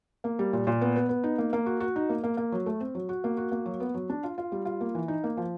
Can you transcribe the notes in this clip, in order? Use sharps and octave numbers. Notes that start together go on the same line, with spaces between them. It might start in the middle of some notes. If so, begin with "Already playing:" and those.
A#3
G3
A#2
A#2
B3
B3
B3
D#4
A#3
A#3
F#4
F#4
D#4
A#3
A#3
A#3
F#3
A3
C4
F#3
F#4
A#3
F#4
A#3
F#3
B3
F#3
D4
F4
F4
G3
F4
A#3
E3
D#4
A#3
F3